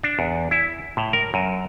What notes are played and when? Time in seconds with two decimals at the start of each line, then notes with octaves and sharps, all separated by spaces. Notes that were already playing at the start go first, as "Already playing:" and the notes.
0.03 D4
0.19 E2
0.51 E4
0.97 A2
1.13 A#4
1.34 F#2